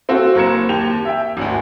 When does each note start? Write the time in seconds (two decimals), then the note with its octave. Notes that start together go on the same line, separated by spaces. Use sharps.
0.09 C4 F4 F#4 A4
0.35 F#1 C4 A#4 G#6 C#7 E7
0.69 D#2 G4 F7
1.05 E5 G5
1.37 G#1 D2